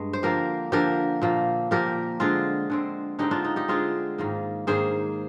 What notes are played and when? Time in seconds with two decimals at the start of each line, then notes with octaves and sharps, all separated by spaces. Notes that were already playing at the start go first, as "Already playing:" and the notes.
Already playing: G2 G#3
0.13 C5
0.23 D3 F3 A#3 G4 A#4
0.72 D3 F3 A#3 G4 A#4
1.22 A#2 F3 A#3
1.71 A#2 F3 A#3 G4 A#4
2.20 D3 G#3 C4 F4 G#4
2.70 D3 G#3 C4
3.19 D3 G#3 C4 D#4 G4
3.31 D4 F4
3.44 D#4
3.56 D#4 G4
3.68 D3 G#3 C4 F4 G#4
4.18 G#2 D#3 A#3
4.67 G#2 D#3 A#3 G#4 C5